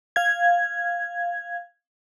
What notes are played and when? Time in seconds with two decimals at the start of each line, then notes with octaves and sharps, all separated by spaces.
0.16 F5 G#6